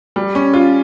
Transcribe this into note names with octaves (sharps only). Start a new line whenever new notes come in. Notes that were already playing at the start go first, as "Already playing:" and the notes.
G3
C#4
F4